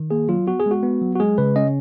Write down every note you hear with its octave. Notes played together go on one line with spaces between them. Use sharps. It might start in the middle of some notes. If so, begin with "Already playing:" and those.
Already playing: D#3
A#3 G#4
F#3 F4
B3 F#4
G#4
G#3
F#4
B3
F#3
F#4
G#3 G#4
C#3 B4
C#4 D#5